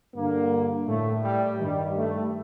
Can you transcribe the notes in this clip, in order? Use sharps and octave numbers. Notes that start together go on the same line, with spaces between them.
G2 D3 A#3
A2 A3
G3
G2 D#3 G3
A3